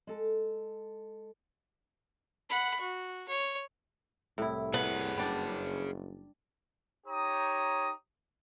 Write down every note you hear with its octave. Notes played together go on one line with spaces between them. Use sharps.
G#3 A4 A5
F#5 B5
F#4
C#5
C2 A2 E4
G#4 B4 C#5 F#5
F#1 G3 D4
D#4 G4 C#5 A#5 D#6